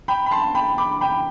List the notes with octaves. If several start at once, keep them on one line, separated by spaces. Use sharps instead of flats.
G5 B5
B5
A5 C6
G5 B5
B5 D6
G5 B5